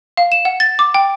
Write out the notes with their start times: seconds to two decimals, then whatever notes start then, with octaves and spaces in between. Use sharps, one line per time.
0.17 F5
0.32 E7
0.45 F#5
0.60 A6
0.79 D6
0.94 G5